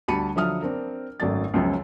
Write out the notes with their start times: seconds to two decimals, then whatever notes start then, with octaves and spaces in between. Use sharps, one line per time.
0.08 D2 G3 A5 B5 C#7 D#7
0.35 D3 F3 F#3 E5 D#6 F6
0.62 C4 D4 A#4
1.20 G#1 F#2 A3 D5 A6
1.54 C#2 F#2 F3 C#4